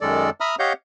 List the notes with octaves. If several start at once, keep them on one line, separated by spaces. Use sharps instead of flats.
F#2 D#3 G#3 A4 D5
E5 A#5 B5 D#6 F6
G4 C#5 D#5 F5 F#5 G6